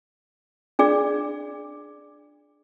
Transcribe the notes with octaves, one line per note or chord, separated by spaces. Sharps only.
D4 G#4 D5